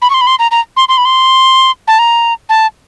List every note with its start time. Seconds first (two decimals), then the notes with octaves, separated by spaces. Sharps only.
0.02 B5
0.10 C#6
0.14 C6
0.21 B5
0.27 C6
0.39 A#5
0.51 A#5
0.77 C6
0.89 C6
0.97 B5
1.05 C6
1.88 A5
1.99 A#5
2.49 A5